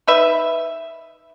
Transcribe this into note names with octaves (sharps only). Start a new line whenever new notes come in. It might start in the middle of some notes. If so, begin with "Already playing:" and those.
D#4 B4 E5